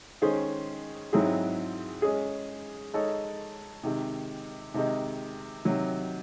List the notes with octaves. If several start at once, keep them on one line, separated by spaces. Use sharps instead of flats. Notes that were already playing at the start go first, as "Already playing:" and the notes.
D#3 G#3 C#4 G#4 C5
G#2 F#3 C4 E4 G#4
G#3 C#4 G#4
G#3 D#4 A4 C#5
C3 D#3 G#3
C3 D#3 G#3 D#4
C3 D#3 F#3